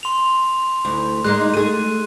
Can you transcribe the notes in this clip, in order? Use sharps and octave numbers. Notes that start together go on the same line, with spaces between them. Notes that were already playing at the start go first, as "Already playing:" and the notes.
C6 F7
D2 E4
G#3 A#3 D#4 F#6
A3 G#4 D#7